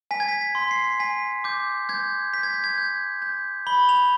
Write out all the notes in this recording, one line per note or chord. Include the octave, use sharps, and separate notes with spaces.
G#5 B6
G#6
B6
B6
C6
C7
G#5 B6
D6 G6
G6 G#6
G6 B6
G#6
G6
G#6
G6
G6
B5 G7
F7